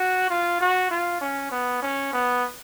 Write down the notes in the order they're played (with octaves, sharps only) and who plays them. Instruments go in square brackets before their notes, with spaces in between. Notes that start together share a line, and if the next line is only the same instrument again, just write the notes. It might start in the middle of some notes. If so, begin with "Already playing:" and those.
Already playing: [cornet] F#4
F4
F#4
F4
C#4
B3
C#4
B3